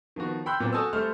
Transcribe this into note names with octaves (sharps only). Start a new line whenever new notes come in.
D#3 F3 B3 F#4
G5 B5 C6 E6 F#6 G6
A#2 F#3 B3 C4
F#4 A4 G#5 A5 D#6 E6
G3 A3 A4 C5 C6 F6